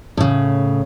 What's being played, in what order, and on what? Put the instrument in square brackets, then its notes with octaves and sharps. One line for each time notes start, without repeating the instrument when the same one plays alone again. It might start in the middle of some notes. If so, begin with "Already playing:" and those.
[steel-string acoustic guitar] A2 C#3